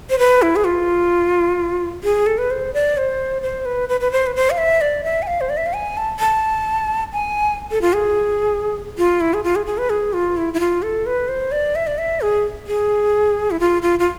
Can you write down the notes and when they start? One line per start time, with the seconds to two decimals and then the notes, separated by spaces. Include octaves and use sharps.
0.10 C5
0.19 B4
0.42 E4
0.56 G#4
0.65 F4
2.04 G#4
2.26 A4
2.38 B4
2.51 C5
2.74 D5
2.97 C5
3.42 C5
3.65 B4
3.89 B4
4.01 B4
4.12 C5
4.27 B4
4.36 C5
4.50 F5
4.58 E5
4.81 D5
5.04 E5
5.22 G#5
5.27 F5
5.41 C5
5.50 D5
5.57 E5
5.66 F5
5.73 G#5
5.97 A5
6.19 A5
7.13 G#5
7.71 A4
7.81 F4
7.93 G#4
8.98 F4
9.21 E4
9.34 G#4
9.44 F4
9.56 G#4
9.66 G#4
9.78 B4
9.90 G#4
10.13 F4
10.37 E4
10.54 E4
10.60 F4
10.82 A4
11.06 B4
11.28 C5
11.52 D5
11.75 E5
11.87 D5
11.98 E5
12.21 G#4
12.67 G#4
13.51 E4
13.60 F4
13.82 F4
13.99 F4